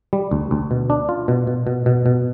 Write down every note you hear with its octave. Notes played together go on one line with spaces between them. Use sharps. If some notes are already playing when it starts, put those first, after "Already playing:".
G3
D2
D2
B2
D4
F4
B2
B2
B2
B2
B2